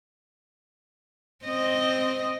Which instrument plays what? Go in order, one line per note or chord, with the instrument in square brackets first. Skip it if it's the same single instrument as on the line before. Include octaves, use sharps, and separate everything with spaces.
[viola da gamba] C4 D#5